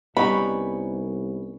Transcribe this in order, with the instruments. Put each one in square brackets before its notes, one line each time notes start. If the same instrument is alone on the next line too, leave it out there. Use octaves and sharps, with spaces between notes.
[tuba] C2 [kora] G3 C#4 D#4 [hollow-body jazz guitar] B3 [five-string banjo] B5